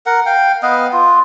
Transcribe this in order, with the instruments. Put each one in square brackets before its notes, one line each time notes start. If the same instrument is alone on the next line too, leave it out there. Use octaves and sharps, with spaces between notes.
[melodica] A#4 F#5
F5 G5
B3 B4 D#5 F5
F4